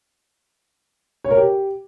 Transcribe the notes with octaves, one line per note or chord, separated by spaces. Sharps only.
C#5
A#4
G4